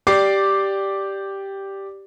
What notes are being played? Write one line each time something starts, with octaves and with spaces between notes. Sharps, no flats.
G4 D5 D6 C7